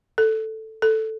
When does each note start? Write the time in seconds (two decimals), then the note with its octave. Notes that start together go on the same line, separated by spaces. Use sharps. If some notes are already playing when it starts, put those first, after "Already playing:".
0.18 A4
0.82 A4